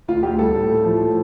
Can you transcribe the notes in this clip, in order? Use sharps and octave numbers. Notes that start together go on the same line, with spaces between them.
D2 F4
D2 G4
G3 A4
A2
A3
F3
A2